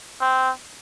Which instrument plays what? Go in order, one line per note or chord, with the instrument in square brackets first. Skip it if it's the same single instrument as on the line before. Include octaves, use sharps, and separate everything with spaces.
[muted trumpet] C4